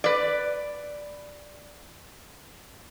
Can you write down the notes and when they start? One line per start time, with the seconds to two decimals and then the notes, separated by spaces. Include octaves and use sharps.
0.04 B4 D5